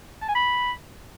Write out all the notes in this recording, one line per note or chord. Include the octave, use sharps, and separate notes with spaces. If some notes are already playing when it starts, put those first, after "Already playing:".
A5
G#5
B5